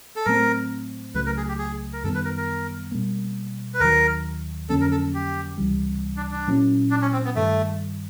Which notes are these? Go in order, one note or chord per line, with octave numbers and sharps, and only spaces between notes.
A4
A2 F#3 A3 C4 A#4
C#2 C#3 F#3 A3 B4
A#4
G#4
G4
G#4
A#4
F#2 D#3 G3 B3 A4
B4
A#4
A#4
B2 G3 A#3
B4
D#2 D#3 F#3 A#4
F2 D3 F#3 A#3 C#4 A4
A#4
A4
G4
C#2 C3 E3 G3
D4
D4
A#2 F#3 A#3 C#4 E4
D4
C#4
C4
B3
G2 D#3 G3 A3